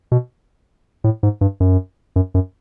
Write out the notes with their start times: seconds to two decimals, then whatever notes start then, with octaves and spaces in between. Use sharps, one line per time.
0.12 B2
1.04 A2
1.23 G#2
1.41 G2
1.60 F#2
2.16 F#2
2.34 F#2